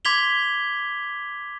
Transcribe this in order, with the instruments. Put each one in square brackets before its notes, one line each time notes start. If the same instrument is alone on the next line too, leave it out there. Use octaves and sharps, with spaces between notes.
[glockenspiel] C6 D6 G#6 B6 F7 G7